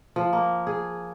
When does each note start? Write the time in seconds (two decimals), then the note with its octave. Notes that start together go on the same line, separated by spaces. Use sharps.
0.16 F3
0.33 A#3
0.67 G#4